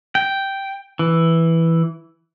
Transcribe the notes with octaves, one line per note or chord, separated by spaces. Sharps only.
G5
E3